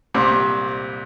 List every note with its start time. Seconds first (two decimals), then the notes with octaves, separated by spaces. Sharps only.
0.14 C2 A#2 G3 C4